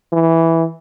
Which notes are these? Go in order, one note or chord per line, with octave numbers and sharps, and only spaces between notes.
E3